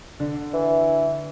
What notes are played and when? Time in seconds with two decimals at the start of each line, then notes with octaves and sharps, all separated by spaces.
0.20 D3
0.54 E3